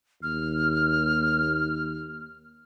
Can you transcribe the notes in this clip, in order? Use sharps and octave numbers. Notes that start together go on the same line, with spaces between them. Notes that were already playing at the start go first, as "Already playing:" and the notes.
D#2 F6